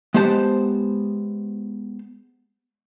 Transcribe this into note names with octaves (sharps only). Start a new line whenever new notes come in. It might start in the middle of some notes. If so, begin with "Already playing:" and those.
G#3 B3 G4 C5 A5